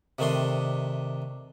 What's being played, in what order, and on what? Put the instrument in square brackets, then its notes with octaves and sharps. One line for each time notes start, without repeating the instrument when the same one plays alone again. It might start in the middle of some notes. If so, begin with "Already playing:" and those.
[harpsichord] C3 D#3 A3 D4 C6